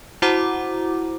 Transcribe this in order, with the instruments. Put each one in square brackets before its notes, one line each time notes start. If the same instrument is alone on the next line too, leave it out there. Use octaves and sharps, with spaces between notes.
[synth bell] E4 F#4 C5 F#5 A#5 D6